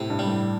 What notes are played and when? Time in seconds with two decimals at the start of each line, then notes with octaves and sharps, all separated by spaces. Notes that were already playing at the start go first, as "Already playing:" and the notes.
Already playing: A2 C3
0.10 G2
0.19 G3
0.27 A2